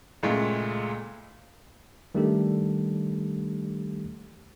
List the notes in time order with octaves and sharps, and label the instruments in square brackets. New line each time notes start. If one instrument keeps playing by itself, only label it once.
[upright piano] C#2 A#2 G#3 A3
[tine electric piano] D#3 G3 A3 D4 G4 A4